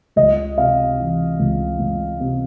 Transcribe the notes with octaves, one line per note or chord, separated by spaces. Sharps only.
C#2 D#5
C3 F5
E3
C#2
C#2
C3